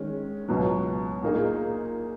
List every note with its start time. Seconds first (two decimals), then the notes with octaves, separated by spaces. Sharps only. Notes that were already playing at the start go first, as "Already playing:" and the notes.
Already playing: D#3 G#3 C#4
0.49 C#2 B2 F#3
1.23 A#2 A#3 D#4 G#4